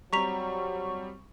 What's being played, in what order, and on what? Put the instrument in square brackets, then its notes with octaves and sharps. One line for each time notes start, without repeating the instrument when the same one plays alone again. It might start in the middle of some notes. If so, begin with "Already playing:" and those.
[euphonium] F#3 [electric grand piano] G3 C4 [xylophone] A#5 B6 F7 [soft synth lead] C#6